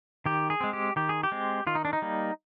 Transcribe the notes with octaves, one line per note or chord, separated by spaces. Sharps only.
D#3 G4
G#4
G#3 C4
G4
D#3 G4
G#4
G4
G#3 C4
D#3 F4
D#4
D4
D#4
G3 A#3